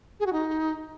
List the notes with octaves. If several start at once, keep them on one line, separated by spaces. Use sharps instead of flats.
G#4
F#4
D#4